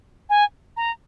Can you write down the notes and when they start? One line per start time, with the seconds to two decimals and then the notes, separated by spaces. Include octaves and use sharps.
0.29 G#5
0.77 A#5